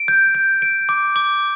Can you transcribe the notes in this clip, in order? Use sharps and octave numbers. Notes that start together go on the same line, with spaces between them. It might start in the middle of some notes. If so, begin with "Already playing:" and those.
Already playing: D7
G6
G6
D7
D6
D6